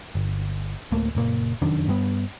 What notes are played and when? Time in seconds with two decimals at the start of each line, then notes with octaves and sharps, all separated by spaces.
0.15 G1
0.92 D1 A3 A#3
1.15 F#1 A#2 A#3
1.62 F1 F#2 D#3 D4
1.88 G2 G3 B3